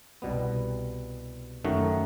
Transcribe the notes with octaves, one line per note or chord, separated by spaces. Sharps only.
C2 B2 G3 B3
F#2 D#3 A3 D#4 F#4